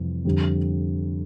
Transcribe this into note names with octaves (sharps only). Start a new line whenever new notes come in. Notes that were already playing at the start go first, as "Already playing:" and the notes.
Already playing: F2 C3 E3 G3
F2 D3 G3